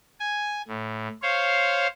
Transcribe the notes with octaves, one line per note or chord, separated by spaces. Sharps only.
G#5
A2
C5 C#5 F5